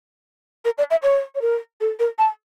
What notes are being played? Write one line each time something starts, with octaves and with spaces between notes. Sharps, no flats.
A#4
D5
E5
C#5
C#5
A#4
A4
A#4
A5